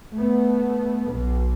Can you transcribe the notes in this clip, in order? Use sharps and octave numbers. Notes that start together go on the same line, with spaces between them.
A3 B3
B1 B2